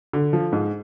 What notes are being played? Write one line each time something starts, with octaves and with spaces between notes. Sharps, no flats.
D3
F3
G#2